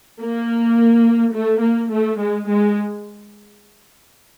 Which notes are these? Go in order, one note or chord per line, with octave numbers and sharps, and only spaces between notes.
A#3
A3
A#3
A3
G#3
G#3